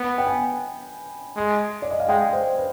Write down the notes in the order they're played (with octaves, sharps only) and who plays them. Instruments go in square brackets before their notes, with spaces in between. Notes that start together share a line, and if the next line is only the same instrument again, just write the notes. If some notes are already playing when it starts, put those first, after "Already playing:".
Already playing: [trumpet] B3 [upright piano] B5
[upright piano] G5
G#5
[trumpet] G#3
[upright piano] D5
D#5
F5
[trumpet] G#3 [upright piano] G5
[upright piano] C5
B4